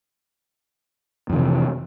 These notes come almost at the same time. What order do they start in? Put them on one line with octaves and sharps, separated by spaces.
F2 D#3 C3 E3